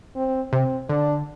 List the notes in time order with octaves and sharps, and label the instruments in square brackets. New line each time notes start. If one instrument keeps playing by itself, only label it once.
[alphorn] C4
[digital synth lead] C3 [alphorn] C4
[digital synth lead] D3 [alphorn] D4